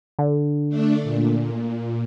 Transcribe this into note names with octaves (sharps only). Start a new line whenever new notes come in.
D3
A3 D4
A#2